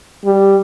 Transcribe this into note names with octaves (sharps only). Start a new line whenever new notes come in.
G3